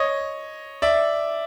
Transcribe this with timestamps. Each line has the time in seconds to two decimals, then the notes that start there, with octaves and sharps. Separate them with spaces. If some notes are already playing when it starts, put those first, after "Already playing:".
Already playing: C#5 D#5
0.82 D5 E5